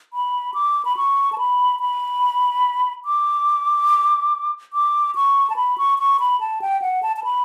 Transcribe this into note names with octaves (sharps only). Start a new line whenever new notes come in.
B5
D6
B5
C#6
A5
B5
B5
D6
D6
C#6
A5
B5
C#6
C#6
B5
A5
G5
F#5
A5
A5
B5